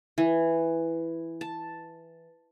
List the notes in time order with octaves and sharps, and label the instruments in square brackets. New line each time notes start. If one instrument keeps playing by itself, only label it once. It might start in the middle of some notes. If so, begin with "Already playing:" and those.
[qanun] E3
A5